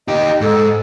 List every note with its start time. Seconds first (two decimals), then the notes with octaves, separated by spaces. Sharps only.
0.08 D#4 G4 D#5
0.41 G#2 A4